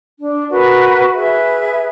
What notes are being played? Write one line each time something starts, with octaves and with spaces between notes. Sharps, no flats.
D4
F#4 A#4 B4
G#4 B4 E5